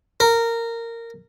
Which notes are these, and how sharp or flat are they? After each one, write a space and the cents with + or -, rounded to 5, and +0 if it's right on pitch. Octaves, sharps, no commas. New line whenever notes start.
A#4 -15